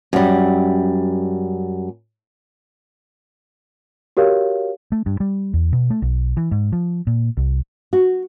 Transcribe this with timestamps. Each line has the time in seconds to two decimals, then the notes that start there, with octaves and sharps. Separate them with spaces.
0.13 F#2 G3
4.17 F#4 G4 A#4 C#5 F5
4.92 A3
5.06 G2
5.20 G3
5.54 E2
5.73 B2
5.90 A3
6.02 B1
6.37 E3
6.51 G#2
6.72 F3
7.07 A#2
7.37 C2
7.93 F#4